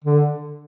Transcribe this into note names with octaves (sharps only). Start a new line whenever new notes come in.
D3